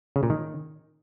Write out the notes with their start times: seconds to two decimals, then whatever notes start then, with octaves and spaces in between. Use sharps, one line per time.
0.16 C#3
0.23 A#2
0.30 D#3